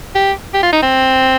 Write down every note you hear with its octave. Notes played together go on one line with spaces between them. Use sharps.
G4
G4
F4
D#4
C4